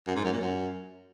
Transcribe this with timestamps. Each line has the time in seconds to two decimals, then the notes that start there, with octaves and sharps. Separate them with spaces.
0.07 F#2
0.16 G#2
0.24 F#2
0.32 A#2
0.41 F#2